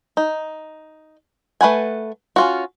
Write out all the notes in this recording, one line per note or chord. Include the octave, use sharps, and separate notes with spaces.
D#4
A3 B4 F#5 G#5
C#4 F4 F#4